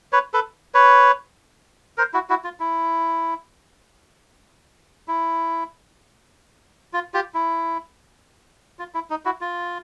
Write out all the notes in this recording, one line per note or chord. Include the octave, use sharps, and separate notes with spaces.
B4 C#5
A4 B4
B4 C#5
A#4 C5
E4 F#4
E4 F#4
F4
E4
E4
F4
F4 G4
E4
F4
E4
D#4
E4 F#4
F4